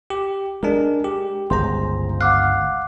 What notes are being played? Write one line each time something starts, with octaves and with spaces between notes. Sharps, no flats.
G4
G#3 D4 G#4 A#4
G4
G1 C#2 G#4 C5 A#5 C6
F5 F#5 D6 F#6